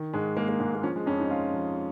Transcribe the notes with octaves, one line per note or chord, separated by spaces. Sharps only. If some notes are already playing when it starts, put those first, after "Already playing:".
Already playing: D#3
G#2 G#3
G#3 A#3
A#3
G#2 G#3
A#3
F3 C#4
G#3
F2 C#4
D#4
G#3 F4
F2